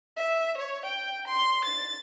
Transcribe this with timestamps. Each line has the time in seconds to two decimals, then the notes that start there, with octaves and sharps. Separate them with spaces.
0.17 E5
0.57 C#5
0.85 G5
1.27 C6
1.65 A6